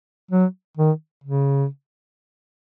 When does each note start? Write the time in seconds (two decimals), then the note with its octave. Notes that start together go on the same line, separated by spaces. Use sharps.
0.31 F#3
0.77 D#3
1.24 C#3